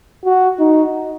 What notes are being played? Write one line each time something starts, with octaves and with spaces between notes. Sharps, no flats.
F#4
D#4